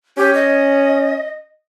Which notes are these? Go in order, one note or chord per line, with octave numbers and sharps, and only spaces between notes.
C#4 G4
D#5